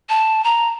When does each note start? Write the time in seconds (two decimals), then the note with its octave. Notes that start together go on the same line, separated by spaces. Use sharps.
0.09 A5
0.44 A#5